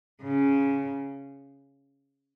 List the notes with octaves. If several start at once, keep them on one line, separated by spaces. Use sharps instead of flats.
C#3